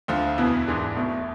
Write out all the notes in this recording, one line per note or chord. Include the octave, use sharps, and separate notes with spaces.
D2 D3 F3
E2 B2 B3 E4 B4
G#1 G#2 E3 G#3 D4
E1 E2 B2 A3